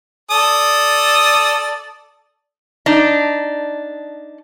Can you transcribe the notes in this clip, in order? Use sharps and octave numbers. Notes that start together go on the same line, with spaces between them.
A4 D5 D#6
D4 D#4